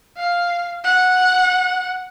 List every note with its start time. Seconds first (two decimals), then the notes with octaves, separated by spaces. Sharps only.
0.17 F5
0.84 F#5